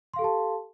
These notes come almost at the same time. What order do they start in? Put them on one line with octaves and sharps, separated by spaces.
C6 F5 A4 G4 A5